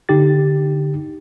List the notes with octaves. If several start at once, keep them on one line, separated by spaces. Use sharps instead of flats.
D3 D#4 G4 A6